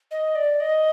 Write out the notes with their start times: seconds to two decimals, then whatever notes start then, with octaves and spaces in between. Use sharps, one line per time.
0.11 D#5
0.35 D5
0.60 D#5